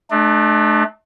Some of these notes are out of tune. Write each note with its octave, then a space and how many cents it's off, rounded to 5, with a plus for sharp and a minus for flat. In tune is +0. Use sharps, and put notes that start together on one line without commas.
A3 -30 D4 +35